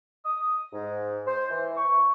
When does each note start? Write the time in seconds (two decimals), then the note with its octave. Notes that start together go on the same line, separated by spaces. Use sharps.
0.24 D#6
0.72 G#2
1.27 C5
1.50 E3
1.77 C#6